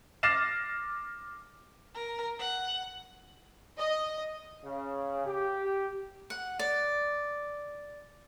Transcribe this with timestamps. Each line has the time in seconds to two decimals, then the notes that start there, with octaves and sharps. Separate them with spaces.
0.23 D6 F6 A6 A#6 C7 E7
1.94 A#4
2.39 F#5
3.78 D#5
4.64 C#3
5.26 G4
6.30 F#5
6.59 D5